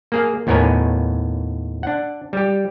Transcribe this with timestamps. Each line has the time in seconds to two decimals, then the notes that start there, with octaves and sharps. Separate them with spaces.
0.12 A#3 G#4 F5
0.47 D#2 A2 B3 A#4 C#5 G#5
1.83 D4 F#5
2.33 G3 G4